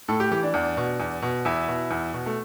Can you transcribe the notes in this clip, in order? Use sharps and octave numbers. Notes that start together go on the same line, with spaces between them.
A2 A4
G4
E3 G4
D4
E2
B2
E2
B2
E2 E4
B2
E2
B2
A3